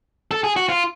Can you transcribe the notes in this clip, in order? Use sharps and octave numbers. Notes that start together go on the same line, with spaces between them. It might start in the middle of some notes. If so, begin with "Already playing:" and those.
A4
G#4
F#4
F4